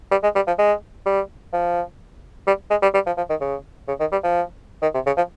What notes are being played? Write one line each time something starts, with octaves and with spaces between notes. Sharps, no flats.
G3
G#3
G3
F3
G#3
G3
F3
G3
G#3
G3
G3
F3
F3
D#3
C#3
C#3
D#3
G3
F3
D#3
C3
C#3
F3